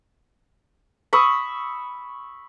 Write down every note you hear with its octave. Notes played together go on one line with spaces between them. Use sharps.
B5 C#6 D#6 E6